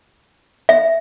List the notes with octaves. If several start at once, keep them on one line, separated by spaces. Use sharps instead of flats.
E5